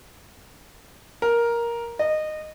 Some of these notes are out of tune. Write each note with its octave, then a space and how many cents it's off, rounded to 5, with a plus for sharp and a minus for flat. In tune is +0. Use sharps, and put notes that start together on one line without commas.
A#4 +10
D#5 -15